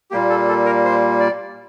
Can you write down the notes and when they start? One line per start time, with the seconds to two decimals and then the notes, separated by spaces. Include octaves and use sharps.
0.11 A#2 G3 A#3 G4
0.30 A4
0.48 A4
0.66 A#4
0.85 C5
1.20 D5